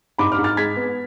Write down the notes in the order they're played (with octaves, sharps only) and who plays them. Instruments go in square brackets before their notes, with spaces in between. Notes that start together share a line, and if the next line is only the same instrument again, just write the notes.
[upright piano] G#2 B5 D6
D6 F6
G#2
F6 A6
G#3 G#6 B6
B3